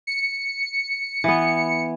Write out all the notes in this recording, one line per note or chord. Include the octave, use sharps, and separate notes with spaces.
C#7
E3 B3